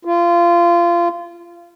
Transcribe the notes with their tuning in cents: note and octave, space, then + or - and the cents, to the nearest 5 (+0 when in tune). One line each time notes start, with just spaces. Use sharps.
F4 -20